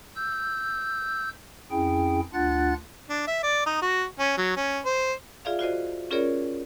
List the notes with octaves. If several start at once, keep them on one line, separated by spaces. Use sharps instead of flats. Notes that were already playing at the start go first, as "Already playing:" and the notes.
E6 G6
F2 C#4 E4 G#4 G5
D2 D4 F4 F#5 F#6 A6
D4
E5
D5
D#4
F#4
C#4
F#3
C#4
C5
F4 G#4 D5 E5 F5
F4 F#4 C5 D5 D#5
C#4 F4 G#4 A#4 C#5 D5